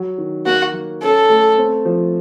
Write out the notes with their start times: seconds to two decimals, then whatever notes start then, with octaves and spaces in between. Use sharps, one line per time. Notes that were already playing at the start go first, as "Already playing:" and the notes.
Already playing: F#3
0.18 D#3
0.46 A#3 F#4
0.74 F#3
1.02 C#4 A4
1.30 A3
1.58 C4
1.85 F3